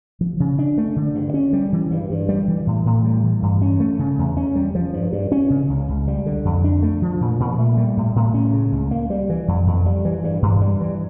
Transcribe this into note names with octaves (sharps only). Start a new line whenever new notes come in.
F3
C#3
D4
A3
D3
G2
C#4
G3
E3
G2
G2
G3
E3
A2
A2
G3
E3
G2
C#4
A3
C#3
E2
C#4
G3
F3
G2
G2
C#4
C#3
C#2
C#2
G3
D3
F2
D4
A3
F3
A#2
A#2
A3
G3
A2
A2
C#4
C#3
C#2
A#3
G3
E3
F2
F2
G3
E3
G2
G2
G3
E3